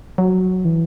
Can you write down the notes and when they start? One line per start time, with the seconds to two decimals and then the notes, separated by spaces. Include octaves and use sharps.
0.18 F#3
0.65 E3